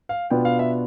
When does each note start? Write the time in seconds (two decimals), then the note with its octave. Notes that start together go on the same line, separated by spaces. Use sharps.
0.09 F5
0.30 B2 B3 D4 F4 G5
0.45 F5
0.59 E5